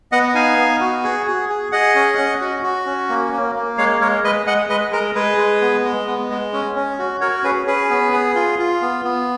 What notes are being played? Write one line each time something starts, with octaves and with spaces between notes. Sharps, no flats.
B3 D#5 F#5
D#4 F5 G#5
B3
F#4
G#4
G#4
G#4
G#4 D#5 F#5
C#4
C#4
F#4
F#4
C#4
A#3
A#3
A#3
G#3 C#5 F5
G#3 A#4 C#5
G#3 B4 D#5
G#3 D#5 F#5
G#3 B4 D#5
G#3 A#4
G#3 G#4 B4
G#3
B3
G#3
B3
G#3
C#4
C#4
F#4
F#4 A#4 C#5
C#4 G#4 B4
C#4 G#4 B4
B3
G#4
F4
F4
B3
B3